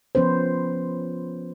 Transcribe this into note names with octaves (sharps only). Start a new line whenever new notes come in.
F3 B3 C#4 B4 C5